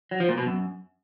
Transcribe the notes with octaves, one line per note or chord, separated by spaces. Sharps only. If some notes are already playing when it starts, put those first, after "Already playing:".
F#3
F3
A#2
B2
F#2